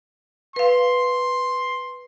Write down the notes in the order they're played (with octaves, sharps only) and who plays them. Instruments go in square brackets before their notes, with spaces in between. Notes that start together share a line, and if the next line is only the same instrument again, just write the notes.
[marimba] B4 F5 [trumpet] C6